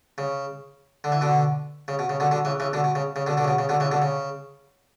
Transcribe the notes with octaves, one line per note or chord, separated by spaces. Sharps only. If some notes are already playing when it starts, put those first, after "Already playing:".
C#3
D3
E3
B2 D3
C#3
B2
C#3
B2 D3
B2 D3
C#3 E3
C#3 E3
B2 D3
B2
C#3
C#3
B2 D3
B2 D3
C#3
B2
C#3
B2 D3
C#3 E3
B2 D3
C#3